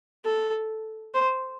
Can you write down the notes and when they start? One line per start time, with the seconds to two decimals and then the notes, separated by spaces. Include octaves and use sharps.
0.25 A4
1.14 C5